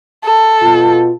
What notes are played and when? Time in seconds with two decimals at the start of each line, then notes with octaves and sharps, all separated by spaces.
0.25 A4
0.61 B2 F4